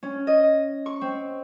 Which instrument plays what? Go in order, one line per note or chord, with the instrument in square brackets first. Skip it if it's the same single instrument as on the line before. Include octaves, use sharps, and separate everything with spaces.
[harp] C#4
D#5
C#6
C4